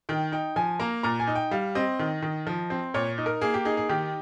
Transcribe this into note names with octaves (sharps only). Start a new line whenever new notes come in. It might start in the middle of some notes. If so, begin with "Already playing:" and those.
D#3 G5
D#4 G5
F3 G#5
A#3 A#5
A#2 A#5
G#5
D#4
G5
G3 F5
C4 D#5
D#3
D#3
F3
C4
A#2 C#5
D#4
A#4
A#3 G#4
G4
D#4 G#4
G#4
D#3 G4